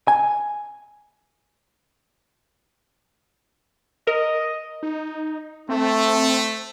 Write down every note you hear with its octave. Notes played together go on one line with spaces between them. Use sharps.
G#5
A#4 D#5
D#4
A3 C4